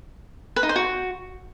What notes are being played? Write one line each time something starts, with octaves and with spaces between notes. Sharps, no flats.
B4
D#4
C5
F#4